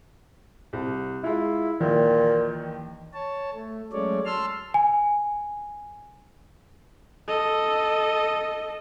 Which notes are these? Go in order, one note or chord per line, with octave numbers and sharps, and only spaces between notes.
C2
G#3 E4 F4
D#2 A#2 D#3 E3
C#5 A5
A3
F#3 G#3 A3 C#4 C#5 D5
A5 C6 E6 F6
G#5
A4 D#5